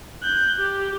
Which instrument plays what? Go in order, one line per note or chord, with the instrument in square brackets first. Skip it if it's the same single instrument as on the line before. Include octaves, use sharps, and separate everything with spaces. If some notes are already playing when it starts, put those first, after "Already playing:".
[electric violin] F#6 G6
G4